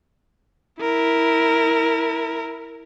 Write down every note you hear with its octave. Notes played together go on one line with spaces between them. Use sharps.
E4 A#4